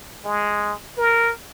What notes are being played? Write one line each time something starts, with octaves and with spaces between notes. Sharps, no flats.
G#3
A#4